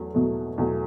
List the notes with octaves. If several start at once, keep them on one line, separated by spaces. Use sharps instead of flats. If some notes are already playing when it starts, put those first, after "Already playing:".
Already playing: E2 F#3 A3
E2 B2 F#3 A3
E2 B2 F#3 A3